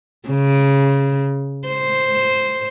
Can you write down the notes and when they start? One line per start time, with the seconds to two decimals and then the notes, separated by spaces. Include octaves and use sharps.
0.29 C#3
1.68 C5